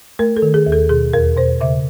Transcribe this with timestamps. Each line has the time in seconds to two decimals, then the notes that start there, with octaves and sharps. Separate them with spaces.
0.19 A3 A#4
0.37 A4
0.42 D#3
0.54 G#4
0.66 D#2
0.72 A4
0.89 B2 G#4
1.13 E2 A#4
1.37 B2 C5
1.61 C#3 E5